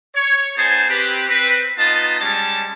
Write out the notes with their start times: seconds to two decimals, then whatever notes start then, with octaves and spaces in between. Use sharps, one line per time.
0.15 C#5
0.57 B3 D#4 G#4 C5 G#5 A5
0.88 C4 G4 B4
1.28 C4 B4
1.77 B3 D#4 F4 B4 D#5 A5
2.19 G3 G#3 C#4 A5